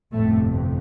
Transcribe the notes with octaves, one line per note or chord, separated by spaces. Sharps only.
G1 F2 A2 C3 A3